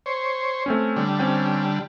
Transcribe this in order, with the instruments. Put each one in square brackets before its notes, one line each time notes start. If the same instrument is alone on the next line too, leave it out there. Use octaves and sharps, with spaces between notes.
[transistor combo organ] C5 C#5
[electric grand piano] A3 C4 C#4
[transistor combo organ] D3 G3
[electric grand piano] C4 C#4 G5